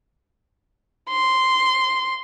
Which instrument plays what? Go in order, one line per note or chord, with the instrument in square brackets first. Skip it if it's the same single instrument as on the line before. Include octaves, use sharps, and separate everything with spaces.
[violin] C6